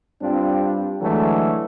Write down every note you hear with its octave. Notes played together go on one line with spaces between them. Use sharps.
G2 G3 C4 D4 F4 G4
D3 E3 F#3 G#3 A3